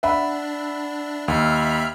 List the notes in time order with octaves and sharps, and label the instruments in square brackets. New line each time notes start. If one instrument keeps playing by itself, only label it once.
[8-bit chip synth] D4 [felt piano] E5 F#5 B5
[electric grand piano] D#2 [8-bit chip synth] E5 B5 F6